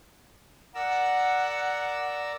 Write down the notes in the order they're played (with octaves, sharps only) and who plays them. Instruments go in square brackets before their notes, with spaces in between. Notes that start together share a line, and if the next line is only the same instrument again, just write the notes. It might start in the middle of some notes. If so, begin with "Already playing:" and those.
[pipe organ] A#4 D5 E6 [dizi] F#5